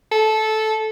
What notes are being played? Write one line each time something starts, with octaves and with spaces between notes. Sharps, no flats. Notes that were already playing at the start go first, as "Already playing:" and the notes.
A4